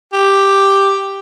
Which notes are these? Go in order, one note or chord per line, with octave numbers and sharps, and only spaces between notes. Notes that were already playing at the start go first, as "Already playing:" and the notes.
G4